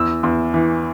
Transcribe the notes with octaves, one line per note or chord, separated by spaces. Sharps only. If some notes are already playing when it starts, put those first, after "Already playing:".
Already playing: E2 E6
E2
E3